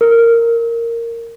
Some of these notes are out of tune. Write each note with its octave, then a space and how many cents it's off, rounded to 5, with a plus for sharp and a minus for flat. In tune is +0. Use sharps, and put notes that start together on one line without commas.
A#4 -10